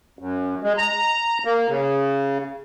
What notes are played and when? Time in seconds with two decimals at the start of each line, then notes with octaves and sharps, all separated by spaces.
0.19 F#2
0.63 G#3
0.78 A#5
1.45 A#3
1.69 C#3